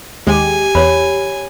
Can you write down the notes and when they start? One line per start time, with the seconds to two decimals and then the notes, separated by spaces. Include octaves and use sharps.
0.27 D#2 G#3 G4 G#5
0.75 E2 C#5 B5